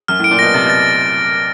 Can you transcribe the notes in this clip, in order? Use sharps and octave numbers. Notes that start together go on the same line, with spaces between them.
F#2 F6
A2
D7
A#2
B2 A#6
C3 A6
B2
A6